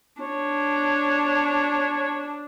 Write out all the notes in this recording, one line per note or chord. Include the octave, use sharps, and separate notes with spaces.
D4 C#5